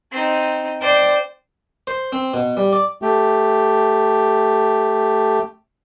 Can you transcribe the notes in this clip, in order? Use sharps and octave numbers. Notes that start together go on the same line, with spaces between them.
C4 D#4
C5 D5 G5
C5
C4
B2
G3
D5
A3 G4